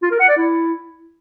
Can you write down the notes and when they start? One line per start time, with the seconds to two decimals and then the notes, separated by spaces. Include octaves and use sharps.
0.03 F4
0.11 A#4
0.20 F#5
0.28 D5
0.37 E4